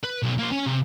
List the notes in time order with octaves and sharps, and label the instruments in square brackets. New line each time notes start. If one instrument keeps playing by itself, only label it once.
[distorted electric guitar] B4
B1
A#3 C5
C#4 G#5
C3